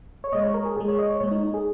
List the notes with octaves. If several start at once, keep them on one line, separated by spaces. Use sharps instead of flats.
C#5
A#2 G#3 D#5
C#5
A#4
G#4
A#2 G#3 G#4
C#5
D#5
C#5
A#2 G#3 C#5
D#4
D#4
G#4